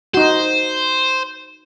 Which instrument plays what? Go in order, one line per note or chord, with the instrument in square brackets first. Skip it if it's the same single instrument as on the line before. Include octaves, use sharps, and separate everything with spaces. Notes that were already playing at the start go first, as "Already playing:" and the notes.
[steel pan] D#4 F#4 [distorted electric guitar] C5